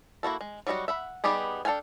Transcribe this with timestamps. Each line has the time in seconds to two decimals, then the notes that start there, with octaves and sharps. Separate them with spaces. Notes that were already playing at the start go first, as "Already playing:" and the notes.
0.23 A#3 E4 F#4 A4
0.41 G#3
0.67 F#3 G3 D#4 E4 F#4
0.88 E5 F#5 B5
1.24 G3 B3 D#4 G4 G#4
1.65 D4 A4 F5 G5 G#5